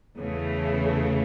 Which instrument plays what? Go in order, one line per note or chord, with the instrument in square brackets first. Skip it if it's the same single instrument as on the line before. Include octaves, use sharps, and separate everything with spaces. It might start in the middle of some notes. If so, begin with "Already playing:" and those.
[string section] E2 C#3 E3 A3